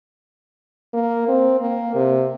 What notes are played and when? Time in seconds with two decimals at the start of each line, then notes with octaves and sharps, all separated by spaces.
0.93 A#3
1.28 C4
1.61 A#3
1.95 C3